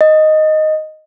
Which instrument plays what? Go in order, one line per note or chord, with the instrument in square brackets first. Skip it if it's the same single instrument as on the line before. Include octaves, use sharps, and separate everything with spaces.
[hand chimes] D#5